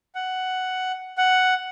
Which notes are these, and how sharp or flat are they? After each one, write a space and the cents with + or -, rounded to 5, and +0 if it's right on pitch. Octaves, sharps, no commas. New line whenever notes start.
F#5 +5
F#5 +5